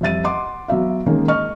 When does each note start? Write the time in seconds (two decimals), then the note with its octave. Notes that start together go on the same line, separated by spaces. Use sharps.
0.01 F2 G3 E5 A6 D#7
0.24 D#5 F#5 C6 D6
0.68 F#3 B3 E5 F5
1.06 D#3 G#3 A#3 C#4 A#4
1.28 D#5 C#6 F6